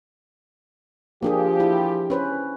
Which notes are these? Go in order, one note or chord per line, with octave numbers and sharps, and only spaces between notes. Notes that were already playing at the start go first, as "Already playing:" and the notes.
F3 A#3 D4 G4 G#4
E4
C#4 B4 C5